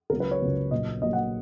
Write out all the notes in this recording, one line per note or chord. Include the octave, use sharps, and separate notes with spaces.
C#2 C#3 F#3 A#4
B4
C#5
C#2 C#3 F#3
A#1 A#2 F#3 D#5
A#1 A#2 F#3 D#5
F#5